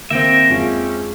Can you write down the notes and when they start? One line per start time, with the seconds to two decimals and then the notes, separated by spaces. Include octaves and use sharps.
0.10 D#3 A#3 C4 E5 G5 A#6
0.49 F2 G#3 C#4 F5